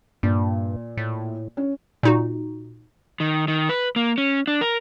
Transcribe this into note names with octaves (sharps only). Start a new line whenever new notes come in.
G2 A#2
A2
C#4
A#2 D#4 F#4
D#3
D#3
B4
A#3
C#4
D4
A#4